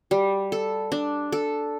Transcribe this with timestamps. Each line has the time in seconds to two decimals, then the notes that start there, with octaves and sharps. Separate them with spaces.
0.11 G3
0.52 A4
0.92 D4
1.32 A4